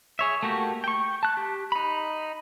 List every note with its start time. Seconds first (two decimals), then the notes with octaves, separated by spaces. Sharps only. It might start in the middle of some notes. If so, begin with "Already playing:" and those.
0.19 G#4 C#5 E5
0.43 A3 A#3 F#4 G4
0.84 G5 C#6
1.23 A5 F#6
1.37 G4
1.72 D#4 B5